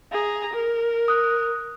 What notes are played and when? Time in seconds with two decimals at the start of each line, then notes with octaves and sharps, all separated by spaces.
0.12 G#4 A#5
0.53 A#4
1.08 D#6 F#6